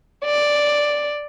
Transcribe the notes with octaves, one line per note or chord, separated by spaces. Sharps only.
D5